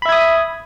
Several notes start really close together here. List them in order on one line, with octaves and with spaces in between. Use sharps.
B5 E5 G#6 D#6